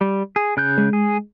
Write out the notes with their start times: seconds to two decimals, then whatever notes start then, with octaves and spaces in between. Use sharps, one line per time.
0.01 G3
0.36 G#4
0.57 C#3 F#6 G6
0.78 G#3
0.93 G#4